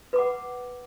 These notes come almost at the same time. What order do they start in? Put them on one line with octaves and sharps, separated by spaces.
B4 D6 F#5